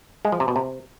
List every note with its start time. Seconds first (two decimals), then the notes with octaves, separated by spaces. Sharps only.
0.25 G#3
0.32 F3
0.40 C3
0.48 B2
0.56 C3